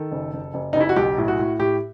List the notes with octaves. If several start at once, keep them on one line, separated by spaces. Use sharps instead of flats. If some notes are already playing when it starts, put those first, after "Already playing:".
Already playing: D#3 A4
F#1
F#1
F#1
F#1 D#4
E4
F#4
B1 G4
A2
F#4
A2
A2 G4